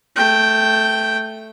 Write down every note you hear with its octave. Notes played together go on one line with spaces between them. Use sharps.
A3 G5